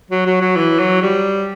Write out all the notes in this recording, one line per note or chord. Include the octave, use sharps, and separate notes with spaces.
F#3
F#3
F#3
E3
F#3
G3